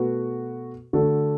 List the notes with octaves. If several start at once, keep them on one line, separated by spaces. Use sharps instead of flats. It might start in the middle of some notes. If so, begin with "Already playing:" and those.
Already playing: B2 A3 F#4 B4
D3 A3 F#4 A4